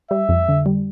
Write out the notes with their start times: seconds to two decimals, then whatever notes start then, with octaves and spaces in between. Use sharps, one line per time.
0.11 G3 E5
0.29 F2
0.48 D3
0.66 G3